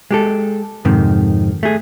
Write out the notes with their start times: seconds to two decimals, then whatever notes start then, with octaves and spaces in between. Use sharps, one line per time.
0.11 G#3 G4 A4
0.85 F2 G#2 C3 D#3
1.63 A3 G#4